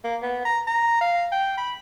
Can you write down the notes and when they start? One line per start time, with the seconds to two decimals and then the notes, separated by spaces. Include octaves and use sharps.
0.04 A#3
0.22 B3
0.45 A#5
0.67 A#5
1.01 F5
1.32 G5
1.58 B5